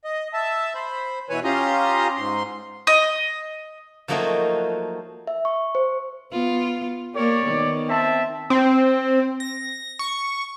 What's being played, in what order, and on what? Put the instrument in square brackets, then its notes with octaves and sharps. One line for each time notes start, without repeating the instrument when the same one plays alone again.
[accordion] D#5
E5 A5
C5 B5
B2 E3 B4 C#5 G#5
C#4 F4 G4 A#5 C6 D#6
G#2 C6
[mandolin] D#5
[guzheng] F3 F#3 A3 A#3 D#4 F#4
[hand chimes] E5
C#6
C5
[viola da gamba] B3 F4
[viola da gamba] A#3 A#4 [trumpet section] G4 C#5 D5
[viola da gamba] D#3 B3
[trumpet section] C4 E5 A5
[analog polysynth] C4
A#6
C#6